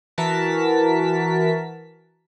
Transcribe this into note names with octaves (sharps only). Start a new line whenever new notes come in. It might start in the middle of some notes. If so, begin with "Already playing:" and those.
E3 F#4 A#4 A5 B6